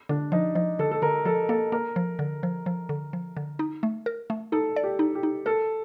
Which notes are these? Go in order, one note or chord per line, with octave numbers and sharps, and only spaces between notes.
D3 D4
F3 D#4
F3 D#4
D3 A4
A4
D3 A#4
F3 A4
A#3 A4
A#3 A#4
F3
D3
F3
F3
D3
F3
D3
D#4
A3
A#4
A3
D#4 A4
D5
G4
D#4
G4
D#4
A4 A#4